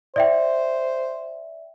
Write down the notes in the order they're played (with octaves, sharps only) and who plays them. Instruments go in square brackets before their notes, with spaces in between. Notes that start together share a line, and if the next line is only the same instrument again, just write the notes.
[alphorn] C5 [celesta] D5 E5 G5